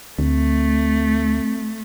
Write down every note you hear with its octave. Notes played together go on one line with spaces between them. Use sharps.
D2 A3 C4